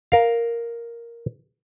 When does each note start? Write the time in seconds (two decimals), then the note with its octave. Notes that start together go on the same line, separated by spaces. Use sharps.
0.12 A#4 F5